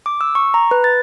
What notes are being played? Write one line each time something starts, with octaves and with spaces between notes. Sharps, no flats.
D6
E6
C#6
A#5
B4
A6